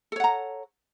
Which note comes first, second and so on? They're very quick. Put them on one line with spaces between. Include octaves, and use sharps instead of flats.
A4 C#5 F#5 A#5